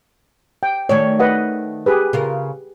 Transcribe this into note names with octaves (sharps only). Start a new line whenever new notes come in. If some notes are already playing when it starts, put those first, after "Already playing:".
G5
D#3 A3 C#5 D5
B4 D#5 F#5
G4 G#4 B4
C#3 F4 A#4